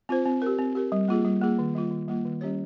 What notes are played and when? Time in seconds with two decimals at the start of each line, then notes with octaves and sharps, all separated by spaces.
0.09 C4 F4 C5
0.25 C4
0.42 G4 A#4
0.58 C4
0.75 G4 A#4
0.92 G3
1.08 A#3 F4 G#4
1.24 G3
1.41 A#3 F4 G#4
1.59 D#3
1.75 G3 A#3 F4
1.91 D#3
2.08 G3 A#3 F4
2.25 D#3
2.41 G3 C#4 G4 C#5